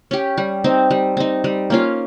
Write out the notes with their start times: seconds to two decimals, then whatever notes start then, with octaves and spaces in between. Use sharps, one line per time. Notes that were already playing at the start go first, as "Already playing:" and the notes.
0.11 C#4 G4
0.38 G3
0.64 C4 D#4
0.91 G3
1.17 C4 D#4
1.44 G3
1.70 A#3 C#4 F4